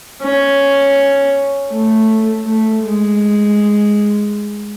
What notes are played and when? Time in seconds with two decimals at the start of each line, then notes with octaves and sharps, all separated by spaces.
0.22 C#4
1.71 A3
2.46 A3
2.84 G#3